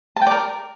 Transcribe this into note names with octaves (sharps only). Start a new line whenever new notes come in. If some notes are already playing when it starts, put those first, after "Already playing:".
A5
G5
D5
A#4